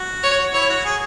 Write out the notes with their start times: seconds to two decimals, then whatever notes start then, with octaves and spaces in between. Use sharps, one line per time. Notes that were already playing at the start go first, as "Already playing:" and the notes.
Already playing: F#4
0.23 C#5
0.53 E4 C#5
0.69 F#4
0.85 G#4